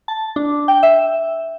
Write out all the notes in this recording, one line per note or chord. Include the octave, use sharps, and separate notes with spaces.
A5
D4
G5
E5